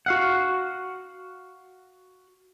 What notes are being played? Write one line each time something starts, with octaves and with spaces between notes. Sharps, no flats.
F#4 F5 F#5